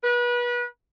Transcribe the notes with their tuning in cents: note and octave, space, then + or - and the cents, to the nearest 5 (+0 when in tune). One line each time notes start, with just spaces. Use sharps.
B4 -30